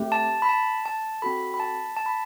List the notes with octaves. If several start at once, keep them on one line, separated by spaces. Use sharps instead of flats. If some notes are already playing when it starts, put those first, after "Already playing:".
Already playing: A3 C4 G4
A5
B5
A5
A5
C4 F#4 A4 B5
B5
A5
A5
B5